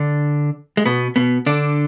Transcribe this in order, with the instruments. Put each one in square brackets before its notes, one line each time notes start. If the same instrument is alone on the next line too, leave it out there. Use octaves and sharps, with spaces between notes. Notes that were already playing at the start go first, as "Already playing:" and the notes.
Already playing: [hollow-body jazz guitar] D3 D4
G#3
B2 B3
B2 B3
D3 D4